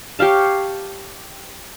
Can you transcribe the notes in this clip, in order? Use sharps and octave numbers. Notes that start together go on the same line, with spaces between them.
G4 C#5 F5 A5